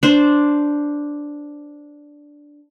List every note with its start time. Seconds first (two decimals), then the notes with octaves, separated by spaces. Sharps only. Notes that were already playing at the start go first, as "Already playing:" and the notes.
0.03 D4 C5